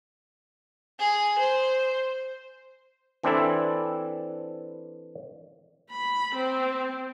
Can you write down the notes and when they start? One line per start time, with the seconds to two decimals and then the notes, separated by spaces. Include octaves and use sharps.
0.99 G#4
1.39 C5
3.23 E3 C4 D4 E4 A4
5.91 B5
6.35 C4